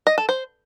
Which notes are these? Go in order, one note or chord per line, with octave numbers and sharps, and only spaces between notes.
D#5
A4
C5